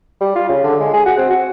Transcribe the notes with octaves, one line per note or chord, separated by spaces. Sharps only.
G3
F4
C#3
D3
G#3
G#4
F#4
C4
F#4